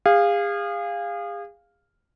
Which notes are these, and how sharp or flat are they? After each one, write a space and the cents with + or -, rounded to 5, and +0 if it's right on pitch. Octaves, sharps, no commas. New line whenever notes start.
G#4 -35 F5 +0